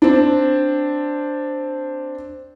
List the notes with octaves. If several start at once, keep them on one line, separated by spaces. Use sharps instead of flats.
C4 D4